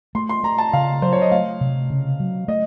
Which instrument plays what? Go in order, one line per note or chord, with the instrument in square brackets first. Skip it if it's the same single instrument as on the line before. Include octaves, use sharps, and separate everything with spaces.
[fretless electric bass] A3 [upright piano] C6
[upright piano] C6
[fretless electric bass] A3 [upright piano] A#5
[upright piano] A5
[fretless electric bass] C#3 [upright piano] F5
[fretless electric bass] F#3 [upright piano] C5
[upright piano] C#5
D#5
[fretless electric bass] A3 [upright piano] F5
[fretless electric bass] C3
C#3
F#3
[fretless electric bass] A3 [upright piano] D#5